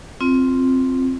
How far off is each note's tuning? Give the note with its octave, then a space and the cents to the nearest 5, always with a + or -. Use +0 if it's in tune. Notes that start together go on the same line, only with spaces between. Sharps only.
C4 +0 F4 +0